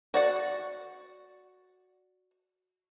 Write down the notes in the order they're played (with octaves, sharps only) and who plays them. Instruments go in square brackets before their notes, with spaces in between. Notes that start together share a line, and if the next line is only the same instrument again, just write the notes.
[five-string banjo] F#4 D5 F#5